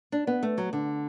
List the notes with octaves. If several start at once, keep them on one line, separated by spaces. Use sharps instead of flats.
D4
B3
A3
F#3
D3